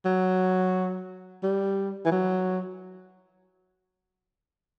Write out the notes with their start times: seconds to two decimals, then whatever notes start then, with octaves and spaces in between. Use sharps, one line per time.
0.05 F#3
1.43 G3
2.06 E3
2.12 F#3